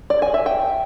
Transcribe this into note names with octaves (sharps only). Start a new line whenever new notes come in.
D5
G#5
E5
G5